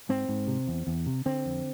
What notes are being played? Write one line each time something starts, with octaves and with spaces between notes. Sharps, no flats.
G#2 C4
G#2
C3
E2
E2
C3
D3 C4
F2